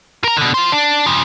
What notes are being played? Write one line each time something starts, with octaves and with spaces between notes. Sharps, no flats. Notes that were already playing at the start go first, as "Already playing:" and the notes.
A#4 A#5
B2 D3
F4 C5
D4
C#3 F3